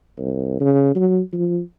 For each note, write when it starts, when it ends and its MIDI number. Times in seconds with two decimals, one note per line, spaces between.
0.18 0.56 36
0.60 0.94 49
0.95 1.20 54
1.33 1.59 53